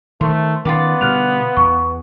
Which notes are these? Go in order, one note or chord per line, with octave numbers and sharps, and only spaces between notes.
D#3 A3 C5
D#3 B3 C#4 F4 F#4 D5
B2 D3 G3 F6 F#6 F7
E2 C#6